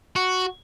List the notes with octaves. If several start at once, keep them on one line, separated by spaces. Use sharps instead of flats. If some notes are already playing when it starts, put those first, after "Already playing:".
F#4